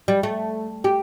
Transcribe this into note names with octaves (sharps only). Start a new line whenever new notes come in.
G3
A3
G4